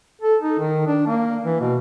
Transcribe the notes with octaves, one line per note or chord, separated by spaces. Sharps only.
A4
D#4
D#3
D4
A#3
E3
B2